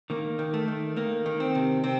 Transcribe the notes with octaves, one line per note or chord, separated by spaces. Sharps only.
D#3 A#3
D#3
A3
D#3
D#3 A#3
D#3
C4
C3
C3 C4